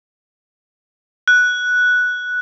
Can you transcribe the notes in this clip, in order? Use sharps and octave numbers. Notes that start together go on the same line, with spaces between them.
F#6